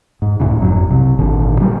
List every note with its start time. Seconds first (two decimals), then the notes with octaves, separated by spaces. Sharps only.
0.22 G#2
0.40 C#2 F#2 A2 C#3
0.59 F#1 F2 G#2 F#3
0.90 C2 C3
1.19 G#1 A#2 D3
1.60 A#2 F#3 G3